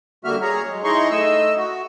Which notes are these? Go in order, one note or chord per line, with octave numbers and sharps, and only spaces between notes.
D3 G3 A#3 F#4 E5 F6
G#4 C#5 A#5
F#3 G#3
D#4 E4 G#4 A#5 C6 C#6
A3 D#5 E6
F#4